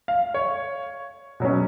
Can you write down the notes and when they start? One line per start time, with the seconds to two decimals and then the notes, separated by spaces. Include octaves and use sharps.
0.08 F5
0.34 C#5
1.40 B2 F#3 C#4